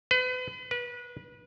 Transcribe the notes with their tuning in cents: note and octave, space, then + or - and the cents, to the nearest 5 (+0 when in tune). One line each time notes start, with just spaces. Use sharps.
B4 +40
B4 -25